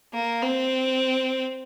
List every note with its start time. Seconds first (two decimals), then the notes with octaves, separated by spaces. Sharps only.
0.13 A#3
0.42 C4